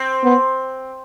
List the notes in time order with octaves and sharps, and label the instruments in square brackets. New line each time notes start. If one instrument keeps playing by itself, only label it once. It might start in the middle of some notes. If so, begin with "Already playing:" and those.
Already playing: [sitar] C4
[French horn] B3